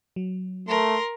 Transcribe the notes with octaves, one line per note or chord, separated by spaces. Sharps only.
F#3
A3 A#4 C6